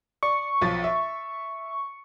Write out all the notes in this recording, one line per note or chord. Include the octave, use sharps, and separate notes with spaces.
D5 C#6
B1 F3 A6
E5